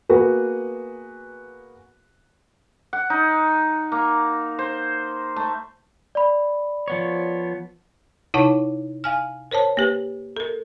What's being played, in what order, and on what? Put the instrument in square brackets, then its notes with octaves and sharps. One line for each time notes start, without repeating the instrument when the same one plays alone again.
[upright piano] A#3 B3 F#4 G#4 B4
[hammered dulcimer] F#5
D#4
A#3
C5
A3
[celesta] D5 B5
[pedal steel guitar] F3 B3 C#5
[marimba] C3 D#4 E4 C#5 F#5 A5
F5 G#5 F6
A#4 C5 C#5 A5
A#3 G4 B4
A4 A#4